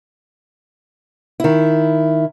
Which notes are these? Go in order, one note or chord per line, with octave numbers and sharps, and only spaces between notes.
D#3 E4